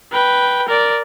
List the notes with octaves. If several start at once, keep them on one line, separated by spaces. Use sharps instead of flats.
B4 G5
A#4 D5